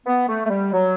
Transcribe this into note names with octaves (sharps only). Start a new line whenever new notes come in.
B3
A3
A3
G3
F#3